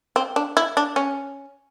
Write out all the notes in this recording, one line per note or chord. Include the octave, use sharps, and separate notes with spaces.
C4
D4
E4
D4
C#4